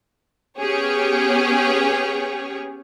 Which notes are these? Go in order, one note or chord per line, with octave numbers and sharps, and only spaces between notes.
B3 C#4 G4 G#4 C#5